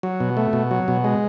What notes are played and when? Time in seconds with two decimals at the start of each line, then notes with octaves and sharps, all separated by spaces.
0.03 F#3
0.20 B2
0.37 A3
0.53 B2
0.71 F#3
0.88 B2
1.04 G#3